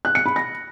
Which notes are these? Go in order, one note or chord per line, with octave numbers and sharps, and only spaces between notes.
F#6
C#7
B5
A#6